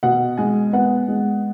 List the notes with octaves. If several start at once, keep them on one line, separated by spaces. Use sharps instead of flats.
B2 F#5
G#3 G#5
B3 F#5
G#3